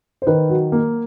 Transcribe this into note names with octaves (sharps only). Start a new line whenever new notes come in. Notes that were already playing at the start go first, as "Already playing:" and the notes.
C5
D#3 B4
F#3
A#3